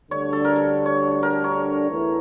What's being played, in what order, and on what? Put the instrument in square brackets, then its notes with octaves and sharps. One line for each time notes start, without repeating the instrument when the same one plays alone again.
[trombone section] D2 D3 G3 D4 [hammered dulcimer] C#5
[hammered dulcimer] A4
A#4
A4
C#5
A#4
C#5
[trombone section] E2 E3 A3 E4